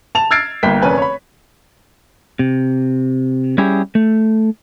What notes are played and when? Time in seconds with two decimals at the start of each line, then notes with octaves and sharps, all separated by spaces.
0.15 A5 F7
0.31 E6 F6 G#6 A6 C7 D7
0.63 G1 A#3 G5 B6
0.82 F1 C#4 A#4 B4 G#5
0.98 C#5 B5
2.39 C3
3.58 G3 C#4 E4 G4 G#4
3.95 A3